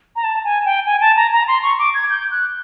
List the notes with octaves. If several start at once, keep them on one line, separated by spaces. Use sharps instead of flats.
A#5
A5
G#5
G5
G#5
A5
A#5
A#5
C6
C#6
D6
G#6
G6
F#6